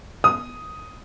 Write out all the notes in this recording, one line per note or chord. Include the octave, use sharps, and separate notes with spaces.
D#6